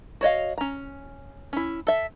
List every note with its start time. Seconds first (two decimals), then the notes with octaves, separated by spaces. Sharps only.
0.21 F#4 C#5 D#5 F5
0.58 C#4 A#5
1.53 C#4 E4
1.87 A4 E5